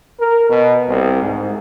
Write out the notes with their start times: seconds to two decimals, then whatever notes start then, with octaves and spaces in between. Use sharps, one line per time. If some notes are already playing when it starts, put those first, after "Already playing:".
0.17 A#4
0.49 B2
0.87 C2
1.21 G#2